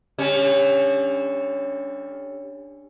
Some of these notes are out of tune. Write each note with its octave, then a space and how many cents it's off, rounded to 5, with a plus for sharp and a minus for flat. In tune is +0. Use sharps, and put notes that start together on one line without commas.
D3 +0 G3 +35 C#4 +0